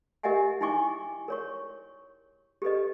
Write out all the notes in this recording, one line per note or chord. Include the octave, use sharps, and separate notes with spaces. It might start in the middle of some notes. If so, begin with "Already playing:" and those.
G4 A#4 D#5 E5 F#5 G#5
D#4 E4 G5 G#5 C#6 D6
A#4 C#5 C#6
G4 A4 B4 D#5